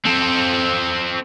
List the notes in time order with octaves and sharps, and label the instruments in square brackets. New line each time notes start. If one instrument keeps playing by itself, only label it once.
[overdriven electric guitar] C4 A4